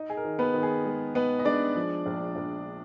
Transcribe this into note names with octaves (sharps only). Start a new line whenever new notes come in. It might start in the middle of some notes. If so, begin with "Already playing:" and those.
Already playing: D#4 D#5
G#4
A#4
D#3
B3 B4
D#3
G#4
G#3
B3 D#4 B4
D#5
G#3 D4 D5
F3
A#1
A#1